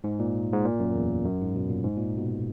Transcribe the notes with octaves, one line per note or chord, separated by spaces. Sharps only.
G#2
A#2
G#2
A#2
F#2
E2
F#2
G#2
B2
A#2
G#2
A#2
B2